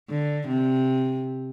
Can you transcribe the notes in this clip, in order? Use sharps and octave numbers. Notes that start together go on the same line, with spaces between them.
D3
C3